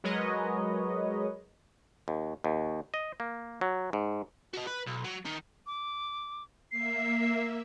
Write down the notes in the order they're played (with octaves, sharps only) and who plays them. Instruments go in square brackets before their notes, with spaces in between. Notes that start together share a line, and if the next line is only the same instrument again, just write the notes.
[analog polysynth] F#3 G#3 A#4 B4 C#5 D#5
[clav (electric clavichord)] D#2
D#2
D#5
A#3
F#3
G#2
[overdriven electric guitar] F#4 D#5
B4
B1
F#3
D#3 D#4
[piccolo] D6
[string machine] A#3 E5 [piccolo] C7